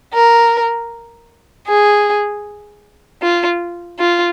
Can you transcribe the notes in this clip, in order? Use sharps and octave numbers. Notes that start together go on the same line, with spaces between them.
A#4
G#4
F4
F4